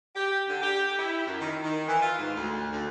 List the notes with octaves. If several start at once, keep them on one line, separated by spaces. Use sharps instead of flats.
G4
D3
G4
E4
F#2
D#3
D#3
E3
F4
G#2
D2
D2